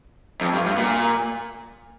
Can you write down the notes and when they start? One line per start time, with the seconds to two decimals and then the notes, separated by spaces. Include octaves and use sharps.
0.41 F2
0.53 G2
0.66 G2
0.78 A#2